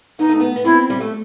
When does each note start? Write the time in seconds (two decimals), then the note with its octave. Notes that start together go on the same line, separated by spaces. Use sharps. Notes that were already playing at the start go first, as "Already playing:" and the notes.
0.19 B3 D#4
0.29 A3
0.40 B3
0.56 B3
0.65 C4 E4
0.90 G3
1.00 A3